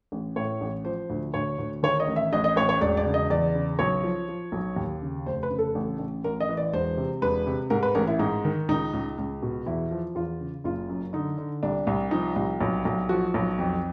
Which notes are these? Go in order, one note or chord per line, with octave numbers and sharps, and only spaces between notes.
A1
A2 C#5
A1
F3 C5
D2
D2 C#5
D2
D#3 C#5
D#5
A1
E5
A1 D#5
D#5
A1 C#5
C#5
E1 D5
D5
C#3
D#5
E2 D5
C#3
B1 C#5
F3
F3
B1
D#2
C#3
F1 C5
B4
C#3
A4
A1
A1
A1 A#4
D#5
E3
D5
E1 C5
C3
E1 B4
C3
G#2 A#4
B4
A1 A#4
E4
G#2 D#4
D#3
C#2 D#4
C#2
C#2
B2
E2 E4
F3
E2 F4
C#3
F#1 F4
F#2
D3 D#4
D3
C2 D4
C2
F3 D#4
C2
B1
B1
F3 F#4
B1
F2